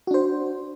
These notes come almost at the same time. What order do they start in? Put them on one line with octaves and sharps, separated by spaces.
F#4 D4 C5